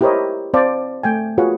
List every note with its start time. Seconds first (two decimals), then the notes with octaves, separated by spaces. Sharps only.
0.01 E4 G4 A#4 C5 C#5 D#5
0.54 C4 C5 D5 F5 A5
1.03 A3 G5 G#5
1.38 F4 F#4 G#4 B4 C#5 F#5